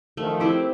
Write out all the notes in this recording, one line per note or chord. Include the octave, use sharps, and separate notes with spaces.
D#3 F3 A3
C4 E4 G4